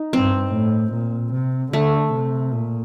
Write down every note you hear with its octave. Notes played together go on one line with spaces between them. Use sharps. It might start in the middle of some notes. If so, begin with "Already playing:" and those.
Already playing: D#4
G2 C4
A2
A#2
C3
D3 A3
C3
A#2